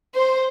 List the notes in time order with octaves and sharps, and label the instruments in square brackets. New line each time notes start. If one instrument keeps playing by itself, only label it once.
[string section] C5